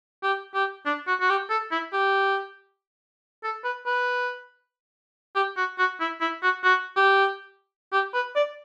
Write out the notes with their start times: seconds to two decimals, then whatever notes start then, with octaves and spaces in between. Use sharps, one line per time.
0.23 G4
0.54 G4
0.86 D4
1.07 F#4
1.20 F#4
1.29 G4
1.50 A4
1.72 E4
1.93 G4
3.44 A4
3.64 B4
3.86 B4
5.35 G4
5.57 F#4
5.78 F#4
6.00 E4
6.21 E4
6.43 F#4
6.64 F#4
6.96 G4
7.93 G4
8.14 B4
8.36 D5